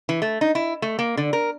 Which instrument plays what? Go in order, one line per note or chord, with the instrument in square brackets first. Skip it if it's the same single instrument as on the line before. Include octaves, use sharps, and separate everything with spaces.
[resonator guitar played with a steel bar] E3
A3
D#4
E4
A3
A#3
D3
A#4